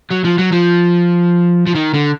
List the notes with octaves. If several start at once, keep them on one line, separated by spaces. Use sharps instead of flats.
F#3
F3
F#3
F3
F3
D#3
D3